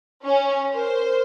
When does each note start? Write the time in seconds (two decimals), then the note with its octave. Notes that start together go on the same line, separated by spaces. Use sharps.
0.25 C#4
0.73 A#4 C5